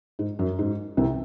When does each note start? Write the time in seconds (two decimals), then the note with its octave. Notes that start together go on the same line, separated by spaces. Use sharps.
0.19 G#2
0.39 F#2
0.59 G#2
0.97 C2 C3